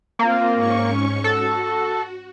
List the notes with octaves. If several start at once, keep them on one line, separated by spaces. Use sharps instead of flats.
A#3 C4 F4
G#2 C#4 C#6
F#4 A4